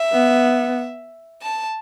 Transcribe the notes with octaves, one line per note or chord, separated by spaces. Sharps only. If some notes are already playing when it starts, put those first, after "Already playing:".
Already playing: E5
B3
A5